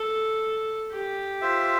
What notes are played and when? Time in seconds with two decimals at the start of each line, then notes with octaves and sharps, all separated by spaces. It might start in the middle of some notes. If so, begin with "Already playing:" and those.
Already playing: A4
0.92 G4
1.41 F4 C5 E5